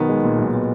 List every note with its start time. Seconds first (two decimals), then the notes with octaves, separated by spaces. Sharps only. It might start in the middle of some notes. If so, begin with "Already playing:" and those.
Already playing: B1 D#3 B3
0.09 G#3
0.24 A#2
0.39 B1
0.54 B3